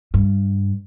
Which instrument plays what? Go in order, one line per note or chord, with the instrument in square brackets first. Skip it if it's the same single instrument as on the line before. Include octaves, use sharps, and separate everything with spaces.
[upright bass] G2